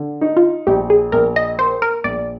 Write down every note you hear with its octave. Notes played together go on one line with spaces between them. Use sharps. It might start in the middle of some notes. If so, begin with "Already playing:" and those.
Already playing: D3
D#4
F4
A#1 G4
G#4
A#1 A#4
D#5
A#3 C5
A#4
A#1 D5